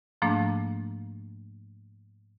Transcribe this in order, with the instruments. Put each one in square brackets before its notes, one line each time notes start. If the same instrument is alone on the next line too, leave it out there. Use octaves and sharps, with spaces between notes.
[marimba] G#2 F3 A3 A#3 D4